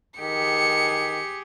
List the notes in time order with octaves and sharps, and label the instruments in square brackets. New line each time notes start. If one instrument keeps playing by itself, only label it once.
[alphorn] D#3 [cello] G4 G#4 [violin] C#7